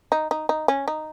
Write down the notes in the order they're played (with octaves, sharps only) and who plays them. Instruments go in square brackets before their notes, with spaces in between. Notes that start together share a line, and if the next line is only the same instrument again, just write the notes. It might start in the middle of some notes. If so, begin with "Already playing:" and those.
[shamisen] D#4
D#4
D#4
C#4
D#4